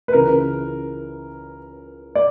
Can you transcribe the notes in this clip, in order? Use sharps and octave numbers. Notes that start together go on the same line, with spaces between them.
B4
C#2 C#3 E3 A#4
D5